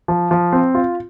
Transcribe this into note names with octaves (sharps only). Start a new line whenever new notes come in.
F3
F3
C4
F4